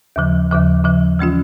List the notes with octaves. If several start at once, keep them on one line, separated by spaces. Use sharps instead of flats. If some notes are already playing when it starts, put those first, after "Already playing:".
D#2 C#3 F3
D#2 C#3 F3
D#2 C#3 F3
E3 G#3 C#4 F4